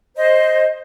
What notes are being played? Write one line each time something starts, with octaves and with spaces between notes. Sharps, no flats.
C5 D#5